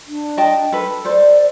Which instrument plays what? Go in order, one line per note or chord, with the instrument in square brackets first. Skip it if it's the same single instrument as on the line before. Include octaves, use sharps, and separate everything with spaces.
[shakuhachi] D4
[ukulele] D#5 G5 A5
A4 B4
[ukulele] A4 C5 [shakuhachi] D5